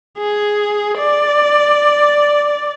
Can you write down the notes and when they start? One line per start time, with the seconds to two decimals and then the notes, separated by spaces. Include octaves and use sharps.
0.18 G#4
0.98 D5